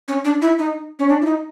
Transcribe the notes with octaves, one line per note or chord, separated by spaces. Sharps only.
C#4
D4
E4
D#4
C#4
D4
E4
D#4